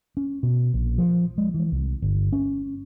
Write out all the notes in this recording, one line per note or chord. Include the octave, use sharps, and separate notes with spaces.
C#4
B2
A#1
F3
G#3
E3
C2
G1
C#4